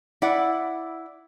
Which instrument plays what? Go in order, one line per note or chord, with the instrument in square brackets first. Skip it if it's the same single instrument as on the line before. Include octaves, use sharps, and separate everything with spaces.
[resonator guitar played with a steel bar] E4 D5 F#5